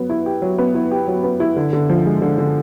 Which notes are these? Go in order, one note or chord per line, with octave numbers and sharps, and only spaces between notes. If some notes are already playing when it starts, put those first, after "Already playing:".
Already playing: F#3 B3
E4
G4
F#3
B3
E4
G4
F#3
B3
E4
D3
D3
F3
G#3
D3
D3